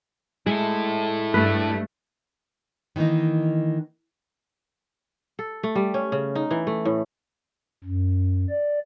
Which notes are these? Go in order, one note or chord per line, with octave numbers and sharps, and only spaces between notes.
G#3 E4 A4
G2 A3 B4
D#3 E3 G3 A#3 D#4
A4
A3
G3
C#4
C#3
D#4
E3
A3
A2
F#2
D5